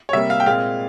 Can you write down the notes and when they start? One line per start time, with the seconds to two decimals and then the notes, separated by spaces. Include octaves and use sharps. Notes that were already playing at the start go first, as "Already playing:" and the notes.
0.09 C#5
0.13 C3 G3 A#3 E5
0.30 F5
0.40 G5
0.46 A#2 G#3 C4 F5